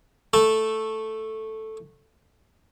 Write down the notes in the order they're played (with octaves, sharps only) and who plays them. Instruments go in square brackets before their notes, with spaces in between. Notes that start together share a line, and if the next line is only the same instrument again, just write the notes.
[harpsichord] A3 A5